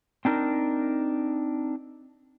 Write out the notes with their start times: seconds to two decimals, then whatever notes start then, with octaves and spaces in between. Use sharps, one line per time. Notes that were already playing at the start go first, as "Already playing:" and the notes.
0.25 C4 D4 D#4 A#4